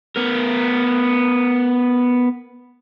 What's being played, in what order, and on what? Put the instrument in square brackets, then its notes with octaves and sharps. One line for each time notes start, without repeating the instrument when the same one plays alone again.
[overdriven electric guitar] B3 A#4